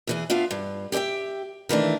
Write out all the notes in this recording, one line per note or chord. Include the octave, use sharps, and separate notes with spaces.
E2 E3 G#4
B3 D4 F4 E5 F5
G2
G4 G#4 D5 E5 G5
D#3 E3 A3 D4